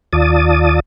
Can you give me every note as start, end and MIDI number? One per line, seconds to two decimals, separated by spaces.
0.13 0.80 39
0.13 0.80 65
0.13 0.80 74
0.13 0.80 81
0.13 0.80 87